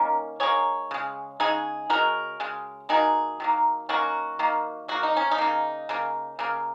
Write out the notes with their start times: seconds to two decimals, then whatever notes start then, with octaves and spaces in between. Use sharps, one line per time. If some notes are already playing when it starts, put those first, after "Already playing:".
Already playing: D#3 A#3 C#4
0.40 D#3 A#3 G#4 C#5
0.91 C#3 G#3
1.40 C#3 G#3 D#4 G#4
1.90 C#3 G#3 F#4 A#4
2.40 C#3 G#3
2.89 D#3 F#3 A#3 D#4 G#4
3.40 D#3 F#3 A#3
3.89 D#3 F#3 A#3 C#4 F#4
4.39 D#3 F#3 A#3
4.88 C#3 A#3 F#4
5.03 D#4
5.17 C#4
5.31 D#4
5.38 C#3 A#3
5.89 C#3 A#3
6.39 C#3 A#3